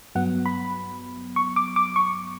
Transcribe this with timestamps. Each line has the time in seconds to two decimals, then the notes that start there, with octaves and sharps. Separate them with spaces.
0.15 G2 F#3 B3 F#5
0.46 B5
1.36 C#6
1.56 D6
1.76 D6
1.96 C#6